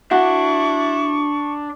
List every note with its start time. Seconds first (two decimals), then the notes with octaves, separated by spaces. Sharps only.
0.11 D4 E4 F#4 C#6